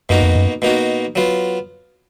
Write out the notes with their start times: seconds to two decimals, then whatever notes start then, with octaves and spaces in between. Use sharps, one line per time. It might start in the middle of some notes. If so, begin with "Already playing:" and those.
0.09 F#2 B2 A#3 D#4 F#4
0.22 F2
0.35 F#2
0.62 B2 A#3 D#4 F#4
1.16 F#3 B3 F4